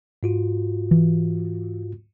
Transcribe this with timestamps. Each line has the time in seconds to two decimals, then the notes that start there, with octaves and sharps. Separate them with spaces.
0.23 G#2 F4 F#4
0.91 E3